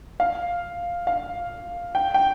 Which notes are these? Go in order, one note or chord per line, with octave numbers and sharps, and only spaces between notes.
F5
F5
G5
G5